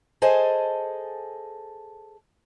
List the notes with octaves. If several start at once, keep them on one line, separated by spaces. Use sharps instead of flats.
G#4 A4 C5 D#5 G#5 A5